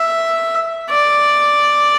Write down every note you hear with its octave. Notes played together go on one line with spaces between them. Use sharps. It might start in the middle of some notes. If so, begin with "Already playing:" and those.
Already playing: E5
D5